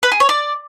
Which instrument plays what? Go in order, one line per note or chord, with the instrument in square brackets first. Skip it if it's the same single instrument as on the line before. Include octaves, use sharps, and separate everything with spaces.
[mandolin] B4
G#4
C#5
D5